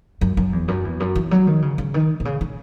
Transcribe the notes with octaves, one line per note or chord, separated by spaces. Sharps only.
F#2
F#2
E2
F#2
E2
F#2
E3
F#3
D#3
C#3
C#3
D#3
B2
C#3
C#3